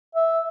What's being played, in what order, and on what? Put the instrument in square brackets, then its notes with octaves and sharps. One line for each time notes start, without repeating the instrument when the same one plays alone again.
[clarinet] E5